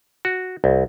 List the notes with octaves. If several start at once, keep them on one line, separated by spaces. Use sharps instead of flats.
F#4
C2